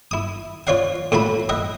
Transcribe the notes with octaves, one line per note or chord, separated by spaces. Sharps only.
E4 D#6
F4 C#5 D5 F5 F#5
A2 F4 F#4 A5 B5
D#5 E5 F#5